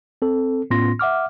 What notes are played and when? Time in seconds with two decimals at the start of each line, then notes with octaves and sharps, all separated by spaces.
0.22 C4 A4
0.70 A2 B3 C#4 F4 C6 A#6
0.99 E5 F#5 D6 F6